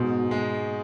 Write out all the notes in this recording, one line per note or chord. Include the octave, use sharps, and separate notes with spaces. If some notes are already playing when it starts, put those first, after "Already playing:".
Already playing: G#2 B2
G#3